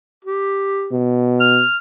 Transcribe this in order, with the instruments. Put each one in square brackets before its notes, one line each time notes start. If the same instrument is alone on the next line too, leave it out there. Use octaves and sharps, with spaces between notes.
[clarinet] G4
[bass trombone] B2
[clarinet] F6